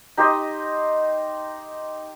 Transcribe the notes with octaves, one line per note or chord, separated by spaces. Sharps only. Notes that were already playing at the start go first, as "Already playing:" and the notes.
D#4 G4 C5 D#5